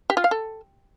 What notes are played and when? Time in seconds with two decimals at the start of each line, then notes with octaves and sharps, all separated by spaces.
0.10 G4
0.17 F4
0.24 F5
0.31 A4